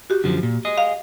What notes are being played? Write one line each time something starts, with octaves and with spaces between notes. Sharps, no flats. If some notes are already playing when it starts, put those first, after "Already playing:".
F#4 G4
F#2 D3 F3
A#2
G#4 D#5
F5